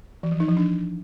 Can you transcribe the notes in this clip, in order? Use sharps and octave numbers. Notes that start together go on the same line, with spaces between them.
E3
F3
D#4
F3
D4